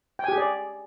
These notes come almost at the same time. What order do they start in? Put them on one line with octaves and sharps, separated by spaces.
G5 G#5 G4 G#4 D5